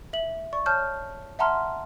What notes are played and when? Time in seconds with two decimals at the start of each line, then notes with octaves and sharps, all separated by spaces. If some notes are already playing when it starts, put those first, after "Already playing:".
0.13 E5 F#7
0.53 D5 C#6
0.66 C#5 A5 F6 G6
1.39 E5 F#5 A5 A#5 C6 F6